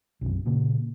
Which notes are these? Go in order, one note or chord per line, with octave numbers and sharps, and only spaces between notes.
B1 F#2 C3
A#2 C#3 A#3